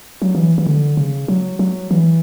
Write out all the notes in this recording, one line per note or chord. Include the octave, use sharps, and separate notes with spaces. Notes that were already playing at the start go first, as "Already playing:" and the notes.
F#3
E3
E3
D3
C#3
F#3
F#3
E3